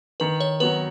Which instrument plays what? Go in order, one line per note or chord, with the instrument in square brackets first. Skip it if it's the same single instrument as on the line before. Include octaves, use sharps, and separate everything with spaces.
[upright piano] D#3 [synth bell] B4
[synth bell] C#5
[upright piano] F#3 B3 [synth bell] B4